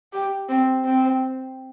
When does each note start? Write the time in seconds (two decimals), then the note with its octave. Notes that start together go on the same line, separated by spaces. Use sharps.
0.13 G4
0.49 C4
0.85 C4